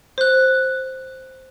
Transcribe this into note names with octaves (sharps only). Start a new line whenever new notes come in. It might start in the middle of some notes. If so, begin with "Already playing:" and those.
C5 F#6